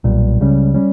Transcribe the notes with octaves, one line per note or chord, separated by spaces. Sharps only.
B1 A#2 G3
C#2 C#3 G3 C#4
G3 C#4